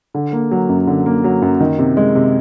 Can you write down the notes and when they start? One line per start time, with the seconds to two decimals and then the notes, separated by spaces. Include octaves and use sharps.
0.14 D3
0.33 A#3
0.51 F#3
0.69 F#2
0.87 D3
1.06 A#3
1.24 F#3
1.42 F#2
1.60 D#3
1.79 C3
1.97 G#3
2.15 C3